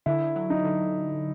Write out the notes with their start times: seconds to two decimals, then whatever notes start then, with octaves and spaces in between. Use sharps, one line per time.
0.06 D3 E4
0.36 F#3
0.50 D#4
0.64 D3